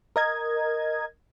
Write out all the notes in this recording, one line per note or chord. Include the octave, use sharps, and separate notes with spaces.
A#4 D#5 G#6